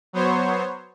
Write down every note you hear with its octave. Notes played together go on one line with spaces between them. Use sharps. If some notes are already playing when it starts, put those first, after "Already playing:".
F#3 B3 C5 C#5